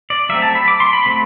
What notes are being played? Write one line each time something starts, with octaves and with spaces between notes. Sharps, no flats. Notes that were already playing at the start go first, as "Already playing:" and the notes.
D5
F#3 A3 C4 E5
A5
B5
D6
C6
B5
F#3 A3 C4